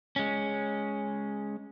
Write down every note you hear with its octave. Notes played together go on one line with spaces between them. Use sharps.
G#3 C#4